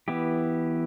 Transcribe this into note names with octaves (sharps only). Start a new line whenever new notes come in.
E3 B3 E4 G4